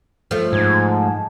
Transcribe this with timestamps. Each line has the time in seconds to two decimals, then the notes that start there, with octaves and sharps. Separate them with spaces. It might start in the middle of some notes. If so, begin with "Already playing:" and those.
0.31 F3 A3
0.53 G#2 G#6
0.89 A5